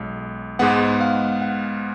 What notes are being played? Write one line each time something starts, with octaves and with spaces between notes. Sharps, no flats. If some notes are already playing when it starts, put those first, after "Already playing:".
Already playing: B1 G#3
G#2 G#3 B3 F#5
F5
F#5